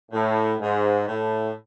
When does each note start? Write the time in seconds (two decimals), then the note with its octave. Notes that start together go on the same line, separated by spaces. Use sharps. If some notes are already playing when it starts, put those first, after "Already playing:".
0.11 A2
0.60 G#2
1.07 A2